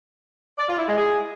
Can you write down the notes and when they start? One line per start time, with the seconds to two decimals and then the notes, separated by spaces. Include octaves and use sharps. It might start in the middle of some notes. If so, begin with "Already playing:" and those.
0.58 D5
0.68 F4
0.78 E4
0.87 G#3
0.97 G#4